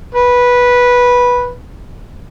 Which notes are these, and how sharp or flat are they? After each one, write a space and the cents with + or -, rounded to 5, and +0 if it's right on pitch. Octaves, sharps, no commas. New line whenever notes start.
B4 -10